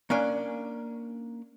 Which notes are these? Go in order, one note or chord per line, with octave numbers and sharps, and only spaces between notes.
A#3 C#4 D4